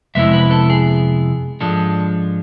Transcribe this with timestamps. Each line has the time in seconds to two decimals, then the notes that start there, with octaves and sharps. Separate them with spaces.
0.15 F2 C3 G#3 B3 E4 E5
0.33 B4
0.51 A4
0.70 G#4
1.61 G#2 F3 G#3 D4 A4